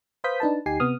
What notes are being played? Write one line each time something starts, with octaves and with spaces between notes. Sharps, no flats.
B4 C5 F5 D#6 G6 B6
D4 D#4 B4 A5
D2 D#4 G4 G#5 C7
C3 B3 D#6 F6